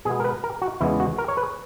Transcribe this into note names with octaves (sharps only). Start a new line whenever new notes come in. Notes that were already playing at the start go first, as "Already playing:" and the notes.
B2 G#3 B3 G#4
A#4
B4
A#4
F#4
E2 C#3 G#3 B3 E4
F#4
A#4
C#5
B4